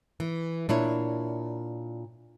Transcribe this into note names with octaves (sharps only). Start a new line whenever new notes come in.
E3
A#2 D4 E4 C#5